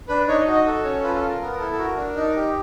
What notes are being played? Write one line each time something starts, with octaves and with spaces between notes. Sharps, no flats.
D4 B4
D#4 C#5
D#5
F#4
D#5
A4
C#4 C#5
F4 B4
A4
F4
A#4
B3 A#4
E4 A4
A4
F#4 A#4
D4
D#4
G4